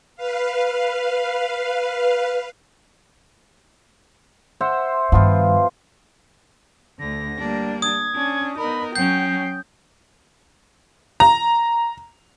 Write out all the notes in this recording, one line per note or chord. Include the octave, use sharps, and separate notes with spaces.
B4 F5
C5 E5 F#5
G2 D#3 F3 B3 F4
D2 D3 A#6
G3 A#3 D4
D#6 G#6
C#4 D4
B3 D#4 A#4 B5
F#3 C#4 G5 G6 C7
A#5